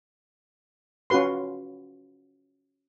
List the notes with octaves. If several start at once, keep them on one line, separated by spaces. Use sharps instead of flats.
C#4 F4 F#4 B4 C6